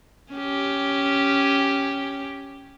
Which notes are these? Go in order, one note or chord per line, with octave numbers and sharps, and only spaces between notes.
C#4 G4